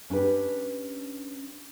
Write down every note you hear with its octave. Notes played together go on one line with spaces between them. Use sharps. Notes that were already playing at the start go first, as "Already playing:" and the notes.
C#4 D4 G4 B4